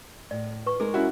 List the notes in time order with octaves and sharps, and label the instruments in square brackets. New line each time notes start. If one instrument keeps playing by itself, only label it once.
[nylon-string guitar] A2 [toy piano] D5
[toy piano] B4 C#6
[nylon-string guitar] G#3 D#4 A#4 [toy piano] G#4
[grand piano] C#4 E4 F#4